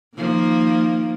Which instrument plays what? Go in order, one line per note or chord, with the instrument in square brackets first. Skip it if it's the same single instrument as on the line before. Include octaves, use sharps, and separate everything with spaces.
[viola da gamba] D#3 F3 A#3